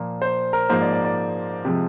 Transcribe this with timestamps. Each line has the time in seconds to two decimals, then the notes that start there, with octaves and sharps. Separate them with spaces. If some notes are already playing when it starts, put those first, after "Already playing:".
Already playing: A#2 F3 A#3
0.22 C5
0.53 A#4
0.69 G#2 F3 A#3 C5
0.82 D5
0.93 D5
1.05 D5
1.65 C3 F3 G#3